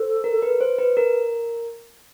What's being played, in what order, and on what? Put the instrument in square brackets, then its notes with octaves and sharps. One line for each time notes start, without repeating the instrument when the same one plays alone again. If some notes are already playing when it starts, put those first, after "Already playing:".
Already playing: [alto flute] A4 [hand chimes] C5
[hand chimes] A#4
B4
C5
B4
A#4